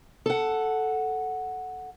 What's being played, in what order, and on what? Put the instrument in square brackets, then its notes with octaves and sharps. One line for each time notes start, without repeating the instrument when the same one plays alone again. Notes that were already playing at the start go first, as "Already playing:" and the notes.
[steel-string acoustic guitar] A4 F#5